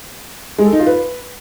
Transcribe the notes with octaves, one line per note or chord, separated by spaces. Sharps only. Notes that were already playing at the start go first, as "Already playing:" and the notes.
G#3
A4
D#4
F4
B4